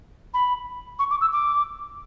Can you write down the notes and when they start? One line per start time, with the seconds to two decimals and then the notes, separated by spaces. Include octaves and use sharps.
0.34 B5
0.99 C#6
1.11 D6
1.21 E6
1.32 D6